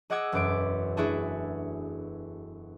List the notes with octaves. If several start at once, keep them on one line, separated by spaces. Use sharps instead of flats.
G#4 D#5 F#5 D6 E6 G#6
E1 F#2 B4 D6 G#6 D7
A3 D4 E4 F#4 G#4 A4